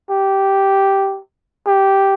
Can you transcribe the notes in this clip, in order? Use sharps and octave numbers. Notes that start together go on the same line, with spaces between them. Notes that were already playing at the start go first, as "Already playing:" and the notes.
G4
G4